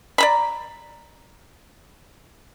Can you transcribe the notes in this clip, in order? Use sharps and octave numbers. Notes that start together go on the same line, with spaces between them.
D5 A#5 B5